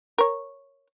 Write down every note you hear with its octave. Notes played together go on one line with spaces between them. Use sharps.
A#4 C#5